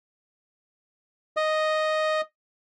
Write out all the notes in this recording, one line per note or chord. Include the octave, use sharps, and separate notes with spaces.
D#5